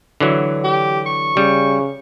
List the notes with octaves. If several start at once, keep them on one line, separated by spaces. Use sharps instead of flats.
D3 E3 F#3
G4
C#6
C#3 G3